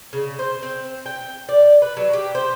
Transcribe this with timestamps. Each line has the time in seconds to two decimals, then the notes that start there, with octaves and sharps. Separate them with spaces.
0.13 C#3
0.39 C5
0.63 C4
1.06 G5
1.49 D5
1.82 B4
1.97 F#3
2.13 G4
2.35 C5